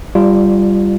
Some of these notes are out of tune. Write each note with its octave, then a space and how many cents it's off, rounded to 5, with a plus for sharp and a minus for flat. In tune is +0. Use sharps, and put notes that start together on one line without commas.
G3 +0 F4 -20 D5 +25